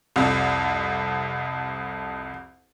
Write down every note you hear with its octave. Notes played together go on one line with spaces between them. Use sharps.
C2 F2